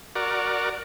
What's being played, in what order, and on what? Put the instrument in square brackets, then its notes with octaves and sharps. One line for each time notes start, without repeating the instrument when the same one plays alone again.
[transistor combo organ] F#4 A#4 D5